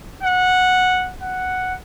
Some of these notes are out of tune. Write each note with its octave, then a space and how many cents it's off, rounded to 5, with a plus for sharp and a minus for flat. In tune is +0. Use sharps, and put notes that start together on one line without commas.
F#5 -10
F#5 +0